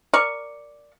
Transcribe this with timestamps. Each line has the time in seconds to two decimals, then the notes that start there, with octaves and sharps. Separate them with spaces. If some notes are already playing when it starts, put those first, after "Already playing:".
0.13 A#4 D5 F5 C#6